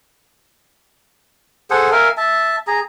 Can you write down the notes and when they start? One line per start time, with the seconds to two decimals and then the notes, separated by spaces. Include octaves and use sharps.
1.70 G#4 A4 C5 F#5
1.92 A#4 E5 F5 G#5
2.17 E5 A5
2.67 G#4 A#5